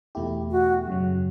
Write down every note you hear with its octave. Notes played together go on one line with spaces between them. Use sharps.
E2 B2 A3 E4 G4
F#4
F#2 C#3 F#3